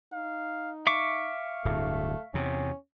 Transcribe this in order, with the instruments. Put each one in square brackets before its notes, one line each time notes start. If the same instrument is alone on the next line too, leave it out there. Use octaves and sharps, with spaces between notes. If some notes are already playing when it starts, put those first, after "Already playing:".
[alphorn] D#4 [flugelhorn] F5
[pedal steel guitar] E5 C#6 D6 [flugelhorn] F5
[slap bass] D1 G2 [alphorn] A3
[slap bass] E2 C3 [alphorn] C#4